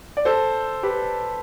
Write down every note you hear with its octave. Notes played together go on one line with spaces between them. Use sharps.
D5
A4 C5
G4 B4